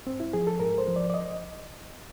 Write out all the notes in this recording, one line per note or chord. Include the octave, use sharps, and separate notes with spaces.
G#2 C4
E4
F3 G#4
A4
G#2 A#4
C5
F3
D5
D5
D#5